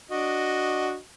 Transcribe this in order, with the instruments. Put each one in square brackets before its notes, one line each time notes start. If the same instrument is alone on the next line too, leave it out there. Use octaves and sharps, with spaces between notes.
[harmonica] D4 F#4 D#5